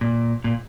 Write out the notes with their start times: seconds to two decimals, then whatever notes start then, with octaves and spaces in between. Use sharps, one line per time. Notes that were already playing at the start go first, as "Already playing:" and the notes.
0.01 A#2
0.44 A#2